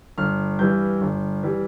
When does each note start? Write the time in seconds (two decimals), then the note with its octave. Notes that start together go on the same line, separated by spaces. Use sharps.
0.18 G1 F6
0.59 G2 E3 G3 G6
1.01 G1
1.43 E3 G3